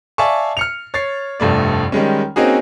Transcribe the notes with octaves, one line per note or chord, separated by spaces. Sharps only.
D5 E5 F5 G#5 A5 C#6
F6 C#7 F7
C#5 A6 C7
F1 G2 A3 D5
D#3 G3 G#3 C#4
A#3 C4 C#4 D#4 F#4 G#4